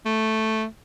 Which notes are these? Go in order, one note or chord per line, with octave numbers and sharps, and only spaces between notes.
A3